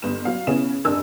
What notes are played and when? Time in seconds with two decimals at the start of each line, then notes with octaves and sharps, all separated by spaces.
0.02 G1 G2 B4 E7
0.25 F#3 F5
0.47 C#3 B3 E4 G#4 C#5 E7
0.85 F1 G2 D4 A#4 G#5 E6